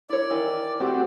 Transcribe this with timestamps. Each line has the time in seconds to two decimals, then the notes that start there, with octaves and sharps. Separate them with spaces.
0.09 E4 C#5 D5
0.30 D#3 E3
0.80 A3 C4 F#4 G4